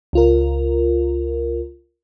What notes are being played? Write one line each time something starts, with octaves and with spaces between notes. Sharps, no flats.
C#2 F4 A#4